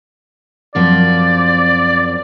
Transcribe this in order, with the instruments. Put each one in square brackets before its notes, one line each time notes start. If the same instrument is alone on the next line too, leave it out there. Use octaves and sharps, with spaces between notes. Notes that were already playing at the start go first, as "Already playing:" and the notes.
[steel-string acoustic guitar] F#2 F3 C4 [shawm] D5